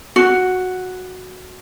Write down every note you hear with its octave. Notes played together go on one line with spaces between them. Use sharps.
F#4